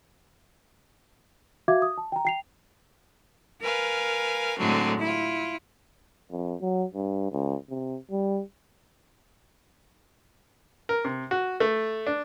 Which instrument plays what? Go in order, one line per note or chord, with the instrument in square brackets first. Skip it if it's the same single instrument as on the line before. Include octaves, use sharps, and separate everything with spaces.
[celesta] F#4 E5 F5 D6 G#6
D#6
A5
G5 A#5
G5 C7 F7
[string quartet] A#4 B4 F5 G#5
A2 D3 F#3 G#3 C4
E4 F4
[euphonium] F2
F#3
G2
C#2
C3
G3
[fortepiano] A#4
C3
F#4
A3
D4